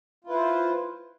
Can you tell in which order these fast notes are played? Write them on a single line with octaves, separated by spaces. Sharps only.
F4 E4 B4 C5